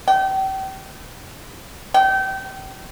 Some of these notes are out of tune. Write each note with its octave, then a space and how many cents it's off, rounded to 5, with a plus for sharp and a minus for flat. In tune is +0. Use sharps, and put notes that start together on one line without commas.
G5 -35
G5 -30